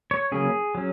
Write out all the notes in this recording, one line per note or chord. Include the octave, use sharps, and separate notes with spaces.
C#5
C#3 F#3 A#3 C#4 G#4
F#3 C#4